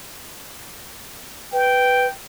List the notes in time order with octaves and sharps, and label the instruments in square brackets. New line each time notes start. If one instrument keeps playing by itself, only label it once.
[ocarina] B4 [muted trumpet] G5